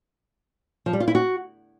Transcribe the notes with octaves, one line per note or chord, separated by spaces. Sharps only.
F3
G3
F4
E4
F#4